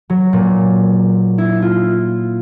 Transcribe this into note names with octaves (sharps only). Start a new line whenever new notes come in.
F#3
A#2
E4
F4